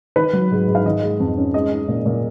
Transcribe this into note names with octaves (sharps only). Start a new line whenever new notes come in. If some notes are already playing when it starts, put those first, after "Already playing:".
D#3 B4
F#3
G#2
G#2
F5
D#3 D#5
G#3
F2
C#4
G#3 D#5
D#4
A#2
A#2